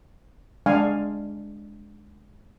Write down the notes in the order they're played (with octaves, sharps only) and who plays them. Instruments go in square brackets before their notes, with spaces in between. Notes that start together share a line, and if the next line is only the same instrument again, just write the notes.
[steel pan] G#3 D4 F5 G#5